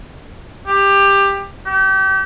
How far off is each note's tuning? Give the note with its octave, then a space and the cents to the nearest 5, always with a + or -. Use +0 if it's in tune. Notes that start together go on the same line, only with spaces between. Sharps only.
G4 +15
G4 -35